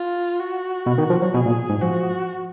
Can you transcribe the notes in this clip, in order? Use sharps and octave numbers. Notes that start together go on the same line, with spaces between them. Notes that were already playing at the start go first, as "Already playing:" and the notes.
Already playing: F4
F#4
B2
D#3
F3
F#3
B2 G#4
A#2
G#2
F3 F#4